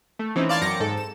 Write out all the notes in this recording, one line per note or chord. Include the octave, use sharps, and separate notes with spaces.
A3
E3 C4 C#4 D#4
D5 F5 A5 C6 F6 G#6
F#2 C4 D6 A#6 C#7
G#2 A4
E7